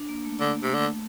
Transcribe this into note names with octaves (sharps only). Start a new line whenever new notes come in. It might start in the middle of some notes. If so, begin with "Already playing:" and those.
Already playing: D4
A#3
A3
D3 A#3
A#3
C3 A#3
D3 A3